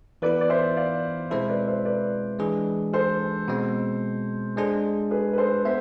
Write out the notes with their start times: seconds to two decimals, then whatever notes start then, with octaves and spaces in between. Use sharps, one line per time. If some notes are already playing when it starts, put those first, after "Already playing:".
0.22 E3 B3 E4 B4 D5
0.41 D5
0.50 C5 E5
0.77 D5 F5
1.30 B2 G#3 C4 E4 A4 C5 E5
1.49 B4 D5
1.68 C5 E5
1.85 B4 D5
2.39 E3 G#3 D4 G#4
2.93 A4 C5
3.48 B2 G#3 C4
4.56 G#3 D4 G#4 A4 C5
5.11 G#4 B4
5.33 B4
5.38 A4 C5
5.65 B3 C5 E5